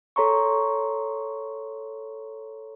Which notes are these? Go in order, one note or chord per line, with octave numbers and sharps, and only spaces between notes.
A4 C#5 A#5 C6 C#6